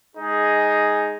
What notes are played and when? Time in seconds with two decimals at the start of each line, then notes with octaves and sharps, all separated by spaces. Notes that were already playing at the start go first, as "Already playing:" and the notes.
0.15 G#3 D#4 G#4